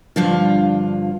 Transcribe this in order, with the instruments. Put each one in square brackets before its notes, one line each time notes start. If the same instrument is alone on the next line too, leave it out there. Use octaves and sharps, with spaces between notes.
[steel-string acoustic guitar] G2 D3 F3 F4